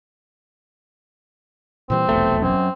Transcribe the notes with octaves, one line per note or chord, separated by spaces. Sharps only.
A#2 E3 G3 C4
F1 B1 E2 A3
F#2 C4